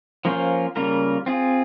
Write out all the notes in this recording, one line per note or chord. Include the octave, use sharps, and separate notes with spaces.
F3 A#3 C#4 F4 C5
C#3 G3 A#3 F4 A#4
C4 F4 G#4